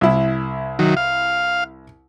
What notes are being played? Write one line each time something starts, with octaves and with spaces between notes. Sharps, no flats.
C2 E4
D#3 F#3
F5